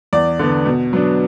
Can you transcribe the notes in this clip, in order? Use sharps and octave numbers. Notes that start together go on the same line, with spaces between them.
E2 D5
D3 B3
B2
F#3 B3 D4